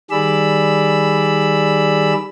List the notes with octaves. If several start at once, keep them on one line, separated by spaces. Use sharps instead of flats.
D#3 G3 G#4 D5 B5 E6